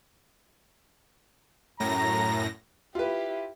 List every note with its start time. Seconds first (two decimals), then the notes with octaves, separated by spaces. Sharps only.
1.80 F#2 A2 A#5 A#6
2.95 E4 F4 G4 B4